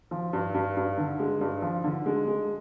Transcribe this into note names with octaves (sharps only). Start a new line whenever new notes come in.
F3
G2
G2
G2
D3
G#3
G2
F3
D3
G#3
G#3